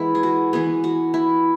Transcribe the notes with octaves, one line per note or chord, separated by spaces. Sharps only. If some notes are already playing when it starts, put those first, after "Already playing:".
Already playing: E3 G#3 B3 E4
G#4
F#4
E3 B3 G#4
F#4
E4